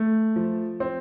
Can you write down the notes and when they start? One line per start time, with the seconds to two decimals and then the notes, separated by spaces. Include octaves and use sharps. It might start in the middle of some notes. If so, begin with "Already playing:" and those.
Already playing: A3
0.36 F3
0.80 C4